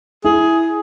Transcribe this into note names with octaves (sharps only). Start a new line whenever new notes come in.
E4 G#4